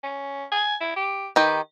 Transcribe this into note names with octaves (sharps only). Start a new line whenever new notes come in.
C#4
G#5
E4
G4
D#3 G4 B4